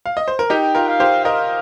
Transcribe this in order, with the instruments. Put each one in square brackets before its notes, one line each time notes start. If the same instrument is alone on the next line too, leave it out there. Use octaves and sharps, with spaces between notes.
[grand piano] F5
D#5
C5
A#4
[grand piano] D#4 G4 [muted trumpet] G5
[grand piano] F4 A#4
[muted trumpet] F5
[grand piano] G4 C5
[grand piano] A#4 D#5 [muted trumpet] F5